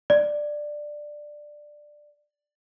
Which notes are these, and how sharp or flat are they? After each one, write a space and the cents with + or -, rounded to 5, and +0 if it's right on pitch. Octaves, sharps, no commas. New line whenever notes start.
D5 +10